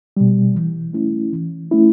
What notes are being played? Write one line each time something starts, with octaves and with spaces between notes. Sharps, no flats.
B2 G3
E3
A3 C#4 E4
E3
A3 C#4 E4